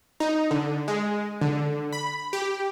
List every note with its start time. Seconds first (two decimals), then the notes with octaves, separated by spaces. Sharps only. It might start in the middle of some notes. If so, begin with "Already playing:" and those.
0.20 D#4
0.51 D3
0.88 G#3
1.41 D3
1.93 B5
2.33 G4